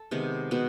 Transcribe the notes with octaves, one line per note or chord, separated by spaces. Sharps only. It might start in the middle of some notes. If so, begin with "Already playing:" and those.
Already playing: A4
C3 D#3 G#3 B3
B2 G#3 B3